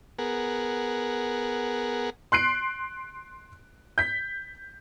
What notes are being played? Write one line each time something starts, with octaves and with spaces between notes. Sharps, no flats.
B3 G#4 A#4 F#5
C6 F#6 C7 D7
G6 B6